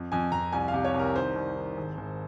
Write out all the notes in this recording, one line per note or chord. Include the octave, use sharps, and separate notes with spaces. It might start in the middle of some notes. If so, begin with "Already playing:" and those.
Already playing: F2
F2 G#5
F2 A#5
C2 G#5
F5
C3
C#5
C2
A#4
D#3 C5
C2
D#3
G#1
G#1